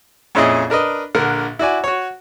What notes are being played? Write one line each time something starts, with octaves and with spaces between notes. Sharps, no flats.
F2 A#2 C#4 E4 G#4 D#5
D4 A#4 B4 D#5
A#1 D3 A#4 F#5
E4 F#4 D5 G#5
F#4 C#5